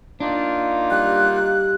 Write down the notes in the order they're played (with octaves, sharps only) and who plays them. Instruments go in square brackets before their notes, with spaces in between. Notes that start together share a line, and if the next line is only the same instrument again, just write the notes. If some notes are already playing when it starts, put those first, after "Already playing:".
[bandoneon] A#3 D#4 F4 [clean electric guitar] D4
[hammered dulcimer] G3 [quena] F#6